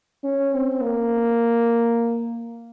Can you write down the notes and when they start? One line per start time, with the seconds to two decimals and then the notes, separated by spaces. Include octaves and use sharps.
0.24 C#4
0.53 C4
0.82 A#3